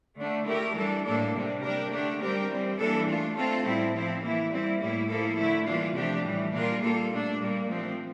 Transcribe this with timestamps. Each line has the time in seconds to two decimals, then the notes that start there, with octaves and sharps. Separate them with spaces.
0.19 D3 A3 D4
0.47 A3 E4 G4 A#4
0.76 E3 G3 D4 A4
1.05 A2 G3 A#3 D4 A4
1.34 C3 G3 D4
1.62 G3 D4 G4 A#4
1.91 D3 A3 D4 G4
2.20 G3 C4 G4 A#4
2.49 E3 G3 C4
2.78 E3 G3 A#3 D4 A4
3.07 A3 D4 F4
3.36 A3 C4 F4 A4
3.64 A2 G3 C4 E4
3.93 F3 C4 E4
4.21 E3 A#3 E4
4.51 G3 C4 E4
4.80 A2 G3 A#3 E4
5.09 F3 A#3 E4 A4
5.37 D3 A3 E4
5.66 E3 G3 A#3 D4 F4
5.95 C3 F3 A3 D4 G4
6.23 A2 E3 G3
6.53 A#2 G3 D4 F4 A#4
6.81 G3 A#3 F4 A4
7.11 A#2 A3 D4
7.39 A#2 G3 A#3
7.68 F3 A3 C4